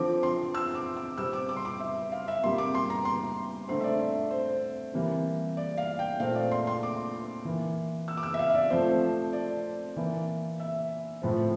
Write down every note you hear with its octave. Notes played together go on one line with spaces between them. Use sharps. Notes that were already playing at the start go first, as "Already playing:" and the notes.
Already playing: D3 F3 C4 D6
C6
E6
D6
D6
C3 G3 C4 E6
D6
D6
C6
D6
E5
F5
E5
C3 G3 A#3 C6
D6
C6
A#5
C6
D3 A3 C4 C6
E5
D5
E5
C5
C3 E3 G3 A#3
D5
F5
G5
A#2 A3 C4 F5
D5
C6
C6
D6
E3 A#3
E6
D6
E6
E5
F5
E5
D5
C3 F3 A3 C5
D5
E3 A#3
E5
A2 F3 C4